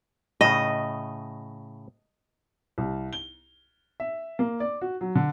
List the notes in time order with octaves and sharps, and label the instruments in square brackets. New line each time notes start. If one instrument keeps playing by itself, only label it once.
[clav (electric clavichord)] A2 C#3 [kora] D#5
[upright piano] C2
G7
E5
A#3
D5
F#4
F#3
D3